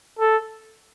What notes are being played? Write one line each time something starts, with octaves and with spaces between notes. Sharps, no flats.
A4